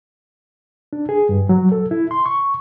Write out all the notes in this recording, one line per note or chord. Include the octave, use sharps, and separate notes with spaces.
D4
G#4
G2
F#3
A4
E4
C6
C#6